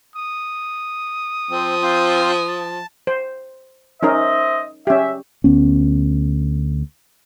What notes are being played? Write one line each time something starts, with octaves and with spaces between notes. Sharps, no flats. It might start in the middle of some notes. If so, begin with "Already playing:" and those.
D#6
F3 C4
C4 F4 C5
A5
C5
C#4 D#4 A#4 C5 D#5 E5
C#4 G4 E5
D2 B3 C#4